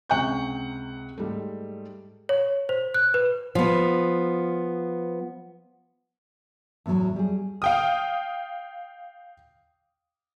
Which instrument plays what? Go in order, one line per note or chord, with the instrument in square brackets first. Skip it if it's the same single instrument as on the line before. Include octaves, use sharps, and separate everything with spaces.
[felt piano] C#2 C3 F#5 G5 C#6 G6
G#2 G3 A3
[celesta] C#5
C5
F#6
B4
[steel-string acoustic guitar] F3 B3
[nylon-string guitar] E2 A2 E3 F#3
G3 G#4
[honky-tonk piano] F5 G5 D#6